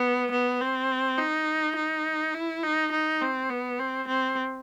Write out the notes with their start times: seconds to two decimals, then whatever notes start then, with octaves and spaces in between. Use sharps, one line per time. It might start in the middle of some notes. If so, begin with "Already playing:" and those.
Already playing: B3
0.31 B3
0.60 C4
1.18 D#4
1.76 D#4
2.34 E4
2.63 D#4
2.92 D#4
3.21 C4
3.50 B3
3.79 C4
4.08 C4